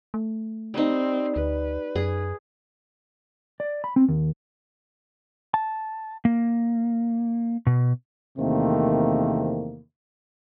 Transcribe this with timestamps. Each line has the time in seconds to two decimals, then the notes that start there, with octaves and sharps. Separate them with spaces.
0.14 A3
0.74 G3 C4 D#4
1.36 D2 B4
1.96 F#2 G#4
3.60 D5
3.84 B5
3.96 C4
4.09 D#2
5.54 A5
6.25 A#3
7.67 B2
8.38 E2 C3 D#3 A3 A#3 C4